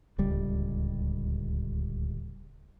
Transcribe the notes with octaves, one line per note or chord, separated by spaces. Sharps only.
D1 C#2 G3